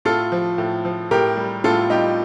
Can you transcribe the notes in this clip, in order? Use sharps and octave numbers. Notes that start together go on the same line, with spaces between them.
A2 F4 A4
F3
A2
F3
A2 G4 A#4
G3
A2 F4 A4
G3 D#4 G4